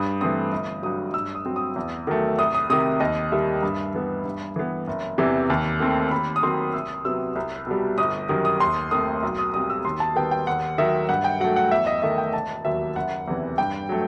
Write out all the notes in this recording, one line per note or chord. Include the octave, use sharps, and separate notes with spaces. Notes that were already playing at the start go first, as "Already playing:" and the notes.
Already playing: G2 D#6
E3 A3 C4 D#6
G1
G2 F#3 D#6
G2 E6
D#6
F#3 C4
D#6
E2
D#3 F#3 A3
C2 D#6
D#6
C3 D#3 D#6
D#2 D#5
D#3 G3 E5
G2
E3 B3
G2
E3 B3
F#1
E2 C3 E3
D#2
D#3 A3 C4
D#2 B5
D#6
D#3 F#3 C4 C6
C2 E6
C3 F#3 B3 E6
C2
B2 G3
G1 D#6
F#2 D#3 G3
D#6
D#2 C6
D#3 A3 C4 D#6
B1
D#6
B2 G3 C4 D#6
E6
D#2 C6
A5
D#3 G3 B3 G5
G5
D#2 F#5
D#3 F#3 E5
G2 F#5
G5
F#3 A3 F#5
F#5
E2 E5
D#5
D#3 A3 E5
G5
E1 A5
D#2 D#3 F#3 E5
F#1 F#5
E2 C3 E3
G2 G5
F#3 A3